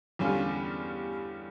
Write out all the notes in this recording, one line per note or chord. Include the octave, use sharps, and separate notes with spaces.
E2 D3 G3 C#4 F4